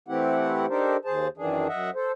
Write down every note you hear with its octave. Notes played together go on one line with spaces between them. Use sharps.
E3 A3 C4 E4 G4 F#5
D4 D#4 G4 A4 A#4 C5
D#2 G#4 C5 A5
F#2 D#3 E3 D4 G#4
F#2 D#5 E5 F#5
A4 C5